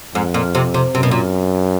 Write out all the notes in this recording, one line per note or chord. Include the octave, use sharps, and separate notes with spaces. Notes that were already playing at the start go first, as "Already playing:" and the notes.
F2 G#2
A#2
C3
C3
F#2 C3
B2
A#2